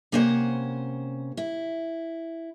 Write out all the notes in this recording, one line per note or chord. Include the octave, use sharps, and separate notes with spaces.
C3 A#3 C#4 C5 D5 F#5
E4